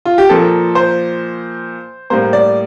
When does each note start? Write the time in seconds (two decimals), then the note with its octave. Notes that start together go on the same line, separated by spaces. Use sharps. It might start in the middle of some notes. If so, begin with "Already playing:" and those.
0.06 F4
0.18 G4
0.29 A#2 F3 A#3 A4
0.75 C5
2.10 A2 G3 A#3 C5
2.33 D5